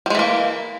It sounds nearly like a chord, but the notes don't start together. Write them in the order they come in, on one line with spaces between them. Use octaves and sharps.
G3 G#3 E3 A#3